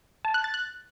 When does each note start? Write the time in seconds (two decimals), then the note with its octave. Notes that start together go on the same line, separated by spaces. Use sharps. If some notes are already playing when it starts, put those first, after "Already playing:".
0.25 A5
0.34 F#6
0.44 A6
0.54 F#6